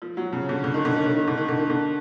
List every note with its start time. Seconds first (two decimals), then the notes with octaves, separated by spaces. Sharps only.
0.02 F3
0.17 F#3
0.32 C#3
0.49 D3
0.64 D3
0.74 D#3
0.85 D3
0.96 D#3
1.06 D3
1.16 D#3
1.28 D3
1.37 D#3
1.48 D3
1.59 D#3
1.70 D3